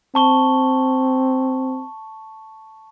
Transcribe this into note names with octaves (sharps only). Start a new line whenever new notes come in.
C4 A5 C#6 G7